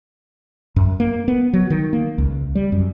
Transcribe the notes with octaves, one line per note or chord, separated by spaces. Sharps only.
F#2
A#3
B3
F#3
D#3
A#3
C#2
G3
F#2